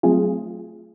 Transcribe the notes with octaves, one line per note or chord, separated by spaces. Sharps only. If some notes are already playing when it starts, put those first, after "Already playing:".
F#3 A3 C4 F4 G#4